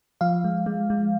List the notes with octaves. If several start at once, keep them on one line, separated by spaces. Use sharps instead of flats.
F3 F5
G#3
G#3
G#3